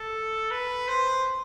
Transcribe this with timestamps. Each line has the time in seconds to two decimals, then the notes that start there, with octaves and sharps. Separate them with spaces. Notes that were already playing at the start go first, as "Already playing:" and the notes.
Already playing: A4
0.51 B4
0.88 C5